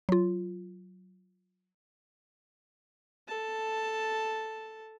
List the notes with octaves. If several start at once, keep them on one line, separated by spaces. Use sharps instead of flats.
F#3 F4
A4 A5